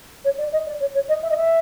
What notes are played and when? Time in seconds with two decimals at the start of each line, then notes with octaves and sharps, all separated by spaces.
0.25 C#5
0.38 D5
0.52 D#5
0.66 D5
0.80 C#5
0.94 C#5
1.08 D#5
1.23 E5
1.30 D#5
1.37 E5